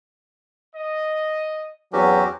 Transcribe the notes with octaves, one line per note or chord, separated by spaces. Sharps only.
D#5
E2 F#3 C4 C#4 F#4 G4